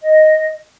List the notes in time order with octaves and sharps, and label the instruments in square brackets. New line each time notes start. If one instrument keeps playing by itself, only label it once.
[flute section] D#5